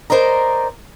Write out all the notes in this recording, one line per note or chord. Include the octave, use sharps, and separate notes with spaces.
A#4 C5 D5 D#5 A#5